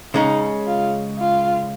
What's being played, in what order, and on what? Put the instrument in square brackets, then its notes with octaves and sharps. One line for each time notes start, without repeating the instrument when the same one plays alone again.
[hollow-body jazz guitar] C#3 G#3 C#4 [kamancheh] D#4
[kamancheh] F4
F4